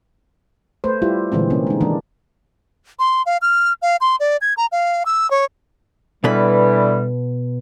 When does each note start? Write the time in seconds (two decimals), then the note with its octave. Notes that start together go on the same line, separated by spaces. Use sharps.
0.84 A3 B4 C5
1.02 G3 E4 F4 G4
1.32 A#2 D3 E3 G#3 C4
1.50 C3 A#3 C4 C#4
1.67 G#3 D#4
1.81 D#3 E3 G#3 A#3 D4
2.99 C6
3.26 F5
3.42 F6
3.82 F5
4.01 C6
4.20 D5
4.41 G#6
4.57 A#5
4.72 F5
5.06 E6
5.31 C#5
6.24 B2 D3 E3 G3 B4